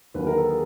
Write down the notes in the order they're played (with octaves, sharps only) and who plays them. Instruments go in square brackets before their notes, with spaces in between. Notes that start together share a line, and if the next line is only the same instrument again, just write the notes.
[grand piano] D#2 D3 F#3 A#3 B4
A#4
A4
G#4